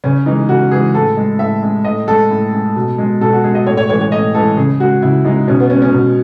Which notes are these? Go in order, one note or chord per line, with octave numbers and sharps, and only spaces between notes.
C#3 C#4
E3 G#3 D#4
C#3 F#4
E3 G#3 G#4
A2 A4
G#3
A2 E5
G#3
A2 D#5
G#3 A4
A2
G#3
B2
G#3
B2 A4
F#4
G#3 G#4
D#5
A2 C#5
C#5
E3 G#3 C#5
C#5
A2 D#5
E3 G#3 A4
C#3 G#4
G#3 F#4
C#3 E4
G#3 D#4
B2 C#4
B3
G#3 C#4
C#4
B2